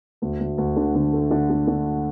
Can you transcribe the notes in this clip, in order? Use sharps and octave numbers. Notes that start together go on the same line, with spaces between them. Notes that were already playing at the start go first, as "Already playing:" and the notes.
D2
D2
D2
D3
D3
A3
D3
D3
D3